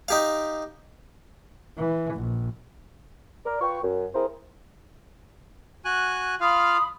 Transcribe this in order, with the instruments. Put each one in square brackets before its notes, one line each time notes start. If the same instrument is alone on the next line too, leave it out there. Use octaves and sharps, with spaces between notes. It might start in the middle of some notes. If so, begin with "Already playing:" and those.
[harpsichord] D#4 G4 F5
[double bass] E3
A#1
[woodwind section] A#4 D5
F4 B4 G5 C#6
F#2
C4 E4 G#4 A#4 C5
[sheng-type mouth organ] F#4 G#5 F#6
[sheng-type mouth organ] F4 F5 [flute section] B5 D#6